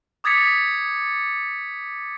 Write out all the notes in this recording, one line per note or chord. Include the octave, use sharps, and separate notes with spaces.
D6 D#6 G#6 A6 B6 C#7